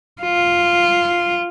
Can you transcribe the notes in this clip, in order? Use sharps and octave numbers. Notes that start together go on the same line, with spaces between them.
F4